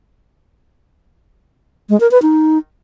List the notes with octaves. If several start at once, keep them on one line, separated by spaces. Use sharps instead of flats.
G#3
A#4
B4
D#4